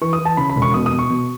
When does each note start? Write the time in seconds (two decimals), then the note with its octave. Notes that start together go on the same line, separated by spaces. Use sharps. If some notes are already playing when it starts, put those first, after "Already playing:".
0.02 E3 C#6
0.13 D#6
0.19 E3
0.25 A5
0.37 C#3 B5
0.50 B5
0.56 E1
0.62 C#6
0.74 B2 D#6
0.86 D#6
0.92 B2
0.99 C#6
1.10 B2